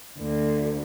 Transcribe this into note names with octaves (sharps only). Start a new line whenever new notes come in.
D2